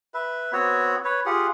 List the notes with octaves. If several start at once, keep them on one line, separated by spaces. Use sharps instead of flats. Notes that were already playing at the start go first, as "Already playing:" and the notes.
B4 E5
B3 C4 F#4 C#5
B4 C#5
F4 G4 G#4 F#5